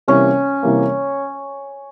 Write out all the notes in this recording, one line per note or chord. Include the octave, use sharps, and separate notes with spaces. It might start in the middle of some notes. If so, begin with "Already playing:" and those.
C3 E3 G3 A#3 C#4
C3 E3 G3 A#3